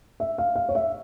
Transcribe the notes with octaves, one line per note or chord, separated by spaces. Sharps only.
E5
F5
F5
C#5
E5